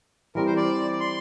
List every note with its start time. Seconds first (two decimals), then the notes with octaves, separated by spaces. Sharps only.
0.35 E3 G3 C4 A#4
0.46 C5
0.56 D5
1.00 C6